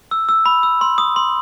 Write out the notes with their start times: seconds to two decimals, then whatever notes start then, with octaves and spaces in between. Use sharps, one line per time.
0.11 E6
0.29 E6
0.46 B5
0.63 E6
0.81 C6
0.98 D#6
1.16 C6